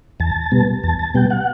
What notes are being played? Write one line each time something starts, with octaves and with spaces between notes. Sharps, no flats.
E2 A5
B2 G3 B3
E2 A5
A5
B2 G3 B3 G5
F#5